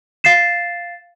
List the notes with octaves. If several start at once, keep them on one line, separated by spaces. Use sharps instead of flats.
F5 A6 C7 E7